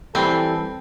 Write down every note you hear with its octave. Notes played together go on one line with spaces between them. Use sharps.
E3 G3 C4 A4 G5 B5